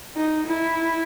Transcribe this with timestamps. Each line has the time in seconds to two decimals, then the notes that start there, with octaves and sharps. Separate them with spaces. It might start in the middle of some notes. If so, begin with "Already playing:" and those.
0.16 D#4
0.46 E4